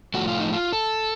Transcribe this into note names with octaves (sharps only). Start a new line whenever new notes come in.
A2 F3 A3 F#4
F4
D#4
F4
A4